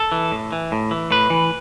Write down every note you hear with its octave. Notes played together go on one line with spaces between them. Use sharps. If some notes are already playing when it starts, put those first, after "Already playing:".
Already playing: A4
E3
A2
E3
A2
E3
A2 B4
E3